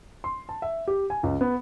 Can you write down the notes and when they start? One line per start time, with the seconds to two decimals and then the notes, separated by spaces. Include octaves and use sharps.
0.24 C6
0.49 A5
0.62 E5
0.88 G4
1.10 G#5
1.23 C#2
1.41 B3